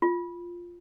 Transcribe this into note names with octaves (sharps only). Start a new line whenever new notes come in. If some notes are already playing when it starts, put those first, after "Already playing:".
F4